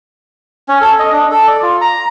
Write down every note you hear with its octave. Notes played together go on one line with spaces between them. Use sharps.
C#4
A4
D#5
D4
A4
D5
F4
A#5